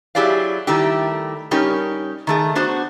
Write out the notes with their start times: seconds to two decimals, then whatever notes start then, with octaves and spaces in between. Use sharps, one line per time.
0.15 F#3 E4 G4 G#4 D5 F5
0.67 D#3 G3 A3 E4 G4
1.51 G3 C#4 D#4 G4 A#4 C#5
2.27 D#3 A3 G#4
2.55 B3 D4 F#4 C5